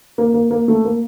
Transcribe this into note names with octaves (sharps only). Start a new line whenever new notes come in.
A#3
A#3
A#3
A3
A#3